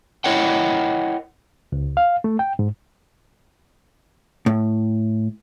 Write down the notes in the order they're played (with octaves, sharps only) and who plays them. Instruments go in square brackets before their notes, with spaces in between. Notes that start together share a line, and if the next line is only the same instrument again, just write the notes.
[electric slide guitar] E4 A#4 C#5 D#5 F#5 G5
[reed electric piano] C#2
F5
A3
G5
G#2
[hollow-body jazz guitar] A2